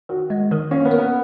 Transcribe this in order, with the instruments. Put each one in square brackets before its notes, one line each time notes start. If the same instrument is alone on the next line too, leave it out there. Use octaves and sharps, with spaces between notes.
[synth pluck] D#3 [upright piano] F#4
[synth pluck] G#3
D#3
[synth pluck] A#3 [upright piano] C#4
[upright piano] B3
[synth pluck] A#4
[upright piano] B3